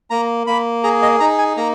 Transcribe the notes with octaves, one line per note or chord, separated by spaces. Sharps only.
A#3 A#5
A#3 B5
G#4 A#5
D#5
D#4 A#5
G#5
A#3 A#5